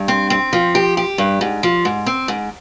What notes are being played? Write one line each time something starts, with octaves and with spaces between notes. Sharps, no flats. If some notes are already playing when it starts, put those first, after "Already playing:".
Already playing: G2
C4
C4
F3
G4
G4
G2
G#2
F3
G#2
C4
G#2